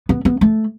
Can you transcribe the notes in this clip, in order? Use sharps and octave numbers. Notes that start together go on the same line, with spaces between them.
B3
B3
A3